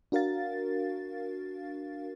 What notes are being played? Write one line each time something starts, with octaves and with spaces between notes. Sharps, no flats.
D4 F#4 A#4 F5 A6